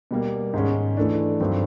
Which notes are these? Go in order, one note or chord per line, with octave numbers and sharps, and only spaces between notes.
B2 G3 A#3
G#2 D#3 G#3 C#4
E3 A3 D4
G2 D#3 F#3 A3 C4